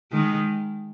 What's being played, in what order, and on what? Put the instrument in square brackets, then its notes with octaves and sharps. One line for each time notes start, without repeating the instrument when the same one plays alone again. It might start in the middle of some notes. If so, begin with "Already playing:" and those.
[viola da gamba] D#3 G#3